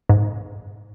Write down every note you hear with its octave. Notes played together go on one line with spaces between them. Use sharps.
G#2